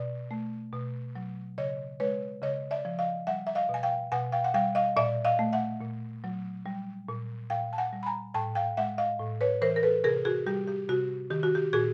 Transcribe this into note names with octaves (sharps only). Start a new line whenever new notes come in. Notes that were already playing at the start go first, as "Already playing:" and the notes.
Already playing: B2 D5
A3
B2
F#3
C#3 C#5 D#5
G#3 B4 C#5
C#3 C#5 D#5
D5 E5
F3
D#5 F5
G3 E5 F#5
E5
D#5 F5
B2
G#5
F5 G5
B2 F#5 G#5
F5 G5
F#5
G3 F5 G5
D#5 F5
A#2 D5 E5
D#5 F5
A3
E5 F#5
A#2
F#3
G3
A#2
A#2 F5 G5
A5
F#5 G#5
G3
B5
G#5 A#5
A2 G5 A5
F5 G5
G#3 E5 F#5
D#5 F5
A2
B4 C#5
E3 A#4 C5
A#4
A4 B4
C3 G#4 A#4
F#4 G#4
G3 G4
G4
C3 F#4
D#3 G4
F#4
G4
A#2 F#4 G#4